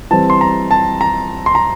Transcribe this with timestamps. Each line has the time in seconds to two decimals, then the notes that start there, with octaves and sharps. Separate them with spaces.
0.11 E3 G3 C4 A5
0.30 C6
0.41 A#5
0.71 A5
1.01 A#5
1.46 C6
1.55 A#5